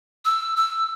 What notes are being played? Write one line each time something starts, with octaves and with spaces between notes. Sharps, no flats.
E6
E6